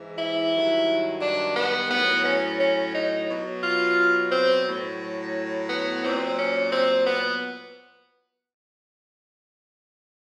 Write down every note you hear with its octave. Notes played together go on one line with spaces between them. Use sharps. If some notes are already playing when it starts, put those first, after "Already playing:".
Already playing: G#2 E3
E4
G2 D#3 F#3
D4
B3
A2 F#3 B3
C#4
C#4
D#4
B2 F#3
F4
C4
A2 F#3
B3
A#2 F#3 C4
C#4
C4
B3